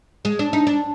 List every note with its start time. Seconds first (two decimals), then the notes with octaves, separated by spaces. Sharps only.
0.25 G#3
0.39 D4
0.53 D#4
0.67 D4